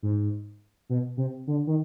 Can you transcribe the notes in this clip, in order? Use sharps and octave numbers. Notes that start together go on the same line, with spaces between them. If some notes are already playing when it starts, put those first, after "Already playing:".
G#2
B2
C3
D3
D#3